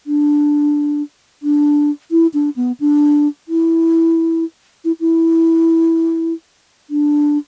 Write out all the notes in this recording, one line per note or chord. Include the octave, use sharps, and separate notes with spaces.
D4
D4
E4
D4
B3
D4
E4
E4
E4
D4